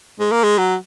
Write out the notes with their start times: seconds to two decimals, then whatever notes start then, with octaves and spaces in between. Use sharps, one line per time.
0.20 G#3
0.31 A#3
0.43 G#3
0.58 F#3